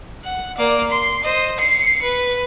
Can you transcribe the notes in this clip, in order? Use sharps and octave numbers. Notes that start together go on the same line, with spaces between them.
F#5
A#3 D5
C6
C5 D#5
C7 C#7
B4